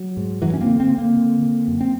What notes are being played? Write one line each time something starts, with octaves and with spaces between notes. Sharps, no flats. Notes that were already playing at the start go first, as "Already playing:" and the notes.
Already playing: F#3
G#2
F#2 E3 F#3
C#4
A#3 C4
D3
A#3 C4
D3
A#3 C4
D3
D3
F#2
C4